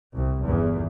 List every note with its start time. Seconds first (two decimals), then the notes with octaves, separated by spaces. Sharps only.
0.14 C2
0.43 G1 E2